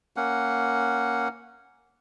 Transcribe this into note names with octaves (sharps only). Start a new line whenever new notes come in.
A#3 C#4 F#5